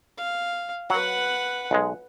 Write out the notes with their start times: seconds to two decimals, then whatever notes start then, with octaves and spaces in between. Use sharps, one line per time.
0.18 F5
0.90 F#3 B4 F#5
1.71 B1 G#3